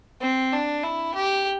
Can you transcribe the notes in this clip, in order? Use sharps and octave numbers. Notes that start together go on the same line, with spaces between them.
C4
D4
E4
G4